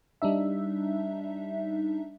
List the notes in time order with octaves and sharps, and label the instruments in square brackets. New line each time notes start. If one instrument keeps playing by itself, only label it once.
[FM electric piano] G3 D4 D#4 E5